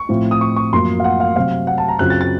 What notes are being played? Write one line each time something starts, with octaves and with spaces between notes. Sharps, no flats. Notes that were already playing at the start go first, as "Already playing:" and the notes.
Already playing: C#6
A2 F3 C4 F4
D#6
C#6
C#6
F#2 F3 A#3 C6
F5
F#5
F5
C3 F#3 C4 F5
F#5
A5
A#5
F#2 C#3 F#3 C4 F4 F#6
A6
A6